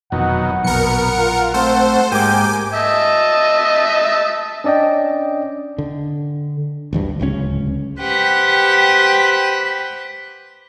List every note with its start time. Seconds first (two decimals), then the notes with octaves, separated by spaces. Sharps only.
0.12 F1 B2 D#3 F#3 F#5
0.64 A#1 B2 F#3 A#4 C#7
1.18 F4
1.54 A3 C4 C5
2.12 G#2 A#3 G4 G5 G#5 D6
2.73 D#5 E5 A5
4.64 C#4 D4 D5 D#5 G5
5.78 D3
6.93 A1 D2 G2
7.20 D1 C#2 C#3 C#4
7.99 G4 B4 C5 F#5 G5